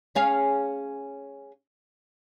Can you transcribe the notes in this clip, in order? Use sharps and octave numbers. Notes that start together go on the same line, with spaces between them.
C#4 G#4 F5